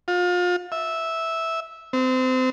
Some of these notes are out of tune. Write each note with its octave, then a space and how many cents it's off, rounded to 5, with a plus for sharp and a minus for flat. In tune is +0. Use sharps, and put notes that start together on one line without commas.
F4 +35
E5 -10
C4 -25